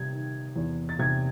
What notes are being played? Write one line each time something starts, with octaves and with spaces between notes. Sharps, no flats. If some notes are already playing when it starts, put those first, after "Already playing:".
Already playing: C3 G3 G#6
D#3
E2
A6
C3 G#6